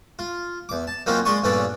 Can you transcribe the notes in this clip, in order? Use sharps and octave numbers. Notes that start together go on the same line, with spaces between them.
F4
E2 D6
A5
F#3 A#3 C4 C#4 D#4 F4
G#3 D5 C6 C#6 D#6
A#1 G2 B3 C#4 A4 D5